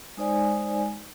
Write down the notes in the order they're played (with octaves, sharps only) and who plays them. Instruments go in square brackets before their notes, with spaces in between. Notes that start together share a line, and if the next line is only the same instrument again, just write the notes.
[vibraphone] G#3 D#4 C5 D5 G#5